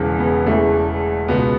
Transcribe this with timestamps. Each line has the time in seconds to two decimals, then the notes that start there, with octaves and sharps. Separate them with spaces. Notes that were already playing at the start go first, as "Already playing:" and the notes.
Already playing: E1 E2 C#3 E3
0.19 B3
0.46 E1 E2 C#3 E3 A3
1.28 C#2 B2 B3